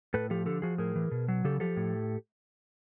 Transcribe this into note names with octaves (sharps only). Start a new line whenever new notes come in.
A2 A4 B4
F3 G4 A4
D3 G4 A4
F3 F#4 G#4
A2 G#4 A#4
E3
B2
F#3
C#3 G4 A4
F3 G4 A4
A2